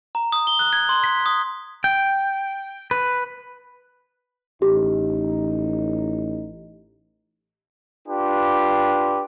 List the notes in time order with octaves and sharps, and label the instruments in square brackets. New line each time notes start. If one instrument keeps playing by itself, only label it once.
[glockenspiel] A#5
D#6
G7
F#6
G#6
C6
B6
D#6
[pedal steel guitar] G5
B4
[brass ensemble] A1 D#4 [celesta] G4
[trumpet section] D4 F4 G4 B4